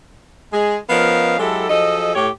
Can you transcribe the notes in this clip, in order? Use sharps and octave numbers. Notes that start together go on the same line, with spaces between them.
G#3 G#4
F3 B3 C#4 A#4 D#5 F5
F#3 G#3 E4 G4 A4
F3 F#3 G#4 A4 D#5
A2 G4 C#5